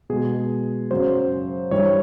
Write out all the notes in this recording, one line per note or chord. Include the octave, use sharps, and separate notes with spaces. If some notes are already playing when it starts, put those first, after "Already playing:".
B2 G#3 G#4
F#2 C#3 F#3 C5
G2 E3 G3 C#5